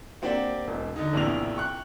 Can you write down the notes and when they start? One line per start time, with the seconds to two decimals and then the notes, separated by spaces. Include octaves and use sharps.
0.22 A#3 C4 D4 G4 D5 F#5
0.68 E1
0.96 D3 D#4
1.13 A#1 E2 A2 C3 D4 F7
1.56 G5 C#6 F#6